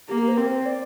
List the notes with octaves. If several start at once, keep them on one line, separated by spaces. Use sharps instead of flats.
A#3 G4
A#4
C5
C4 A#4
C5
D5